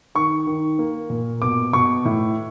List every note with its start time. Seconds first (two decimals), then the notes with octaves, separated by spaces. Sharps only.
0.15 D#3 C#6
0.47 D#3
0.79 A#3
1.10 A#2
1.42 B2 D6
1.73 B2 C#6
2.05 A2